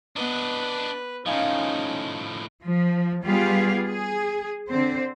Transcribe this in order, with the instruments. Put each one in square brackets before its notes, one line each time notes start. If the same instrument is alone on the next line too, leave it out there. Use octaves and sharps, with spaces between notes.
[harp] B3 D6 [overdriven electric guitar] D4 D#5 [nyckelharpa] B4
[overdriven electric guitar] A2 F3 [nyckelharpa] C#4 D#4 [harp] D#5 F5 G#5
[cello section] F3
G3 B3 F4 G4 G#4 F5
G#4
D3 C4 C5